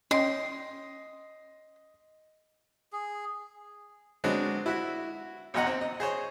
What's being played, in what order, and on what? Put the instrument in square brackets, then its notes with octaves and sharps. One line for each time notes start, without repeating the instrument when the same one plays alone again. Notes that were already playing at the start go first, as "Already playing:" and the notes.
[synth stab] C#4 G5 [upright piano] D#5 [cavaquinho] C6
[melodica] G#4
[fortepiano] F#3 G#3 B3 C4 D4 F#4
E4 F#4 E5
B1 E2 D#5 F#5 A#5
C4
D#5
G#4 C5 C#5